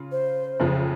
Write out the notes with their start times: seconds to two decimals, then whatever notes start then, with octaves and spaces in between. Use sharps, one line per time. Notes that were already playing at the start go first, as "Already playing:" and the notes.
Already playing: C#3 F4
0.12 C5
0.60 F#1 F2 C#3 F3